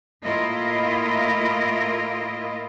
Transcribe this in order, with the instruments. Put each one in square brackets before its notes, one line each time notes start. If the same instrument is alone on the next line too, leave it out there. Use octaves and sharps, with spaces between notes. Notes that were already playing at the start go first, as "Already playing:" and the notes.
[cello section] A2 A#3 E4 F4 A#4 D#5